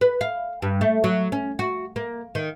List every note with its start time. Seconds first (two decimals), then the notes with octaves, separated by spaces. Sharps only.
0.01 B4
0.21 F5
0.62 G2
0.81 A3
1.04 F#3
1.32 C#4
1.59 F#4
1.96 A#3
2.35 D#3